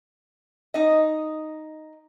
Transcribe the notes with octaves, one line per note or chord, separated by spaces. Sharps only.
D#4 D#5